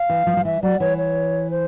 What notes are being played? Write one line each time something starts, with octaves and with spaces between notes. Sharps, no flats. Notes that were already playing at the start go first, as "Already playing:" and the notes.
Already playing: F5
E3
F3
F3
E3 E5
F#3 D5
E3 C#5
C#5
C5